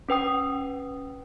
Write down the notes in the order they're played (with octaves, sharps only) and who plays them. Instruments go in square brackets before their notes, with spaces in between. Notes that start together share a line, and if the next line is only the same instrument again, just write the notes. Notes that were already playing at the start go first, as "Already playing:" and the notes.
[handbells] C#4 B4 G5 D#6